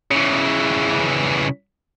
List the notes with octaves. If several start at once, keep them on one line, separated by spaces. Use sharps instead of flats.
C#3 E3